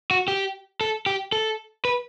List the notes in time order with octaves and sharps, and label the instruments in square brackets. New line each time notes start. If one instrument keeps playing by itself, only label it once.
[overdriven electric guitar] F#4
G4
A4
G4
A4
B4